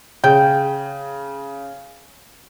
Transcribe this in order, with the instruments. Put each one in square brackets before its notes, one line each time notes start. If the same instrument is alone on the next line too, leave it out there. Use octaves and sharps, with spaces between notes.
[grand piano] C#3 [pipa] G5